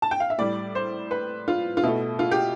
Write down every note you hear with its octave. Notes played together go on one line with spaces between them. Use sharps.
A5
G5
F5
E5
A2 G3 D5
C5
B4
F4
F4
B2 A3 E4
F4
G4